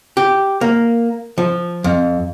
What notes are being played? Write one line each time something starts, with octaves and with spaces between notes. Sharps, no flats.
G4
A#3
F3
F2